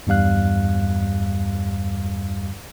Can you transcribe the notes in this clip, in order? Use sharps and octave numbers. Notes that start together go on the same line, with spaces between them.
E2 G2 G3 F5 F#6